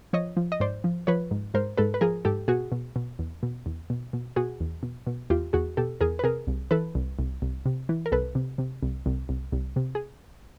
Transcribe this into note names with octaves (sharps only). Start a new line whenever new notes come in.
F3 C#5 D#5
F3
D#5
G#2 C5 D5
F3
F3 B4 C#5
G#2
G#2 A#4 C5
G#2 A4 B4
B4
F3 G#4 A#4
G#2 G4 A4
B2 F#4 G#4
B2
B2
E2
B2
E2
B2
B2
B2 F#4 G#4
E2
B2
B2
E2 F4 G4
E2 F#4 G#4
B2 G4 A4
E2 G#4 A#4
B4
C3 G#4 A#4
C2
E3 A4 B4
C2
C2
C2
C3
E3
A#4
C2 A4 B4
C3
C3
C2
C2
C2
C2
C3
G#4